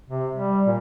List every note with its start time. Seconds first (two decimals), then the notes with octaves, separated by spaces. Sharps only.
0.08 C3
0.35 G3
0.67 A#2